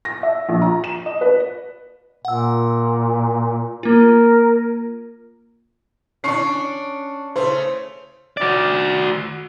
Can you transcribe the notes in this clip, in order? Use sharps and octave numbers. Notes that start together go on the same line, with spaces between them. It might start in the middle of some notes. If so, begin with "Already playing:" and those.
A#6
E5
A#1
A#5
E7
D#5
B4
A#2 F#5 E6
A#3 F4 A#4
C#4 D4 C#6 C7
C#3 A3 C5
F#4 D5